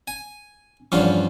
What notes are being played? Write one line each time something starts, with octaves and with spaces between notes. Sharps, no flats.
G#5
E2 G2 F3 C#4 F4 F#4